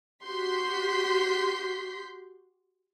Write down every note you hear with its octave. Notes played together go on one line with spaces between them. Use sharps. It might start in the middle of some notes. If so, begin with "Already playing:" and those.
F#4 G4 C6 G6 B6 C7